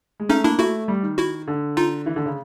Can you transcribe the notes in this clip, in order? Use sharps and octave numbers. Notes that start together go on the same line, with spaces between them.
G#3
A3 C#4 D#4
A#3 D4 E4
A3 E4 F#4
G3
D#3
E4 F#4
D3
D#4 F4
E3
D3
C#3